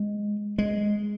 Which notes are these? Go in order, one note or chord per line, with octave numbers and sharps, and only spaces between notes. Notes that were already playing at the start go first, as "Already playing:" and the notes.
Already playing: G#3
G#3